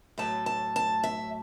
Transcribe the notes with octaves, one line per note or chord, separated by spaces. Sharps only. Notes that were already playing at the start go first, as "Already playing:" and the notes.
A2 F#3 A3 A5
A5
A5
E5